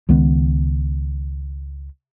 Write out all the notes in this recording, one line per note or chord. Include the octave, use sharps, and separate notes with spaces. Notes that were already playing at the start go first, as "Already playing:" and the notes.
C#2 D#3 G#3 B3